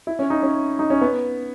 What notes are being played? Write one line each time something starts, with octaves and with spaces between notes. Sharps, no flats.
E4
C#4
D#4
C#4
D#4
C#4
B3